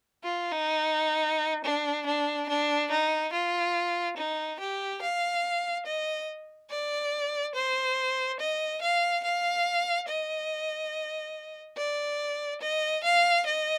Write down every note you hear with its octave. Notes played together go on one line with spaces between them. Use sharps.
F4
D#4
D4
D4
D4
D#4
F4
D#4
G4
F5
D#5
D5
C5
D#5
F5
F5
D#5
D5
D#5
F5
D#5